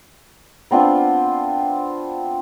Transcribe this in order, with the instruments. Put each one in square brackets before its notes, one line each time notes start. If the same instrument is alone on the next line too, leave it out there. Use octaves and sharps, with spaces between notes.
[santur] B3 C4 D4 F4